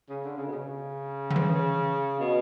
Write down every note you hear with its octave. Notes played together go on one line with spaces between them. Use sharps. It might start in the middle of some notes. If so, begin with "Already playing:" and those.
C#3
D3
C#3
B2
C#3
D3
E3
B2